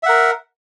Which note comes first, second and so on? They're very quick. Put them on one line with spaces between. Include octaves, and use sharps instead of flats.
E5 F#5 A#4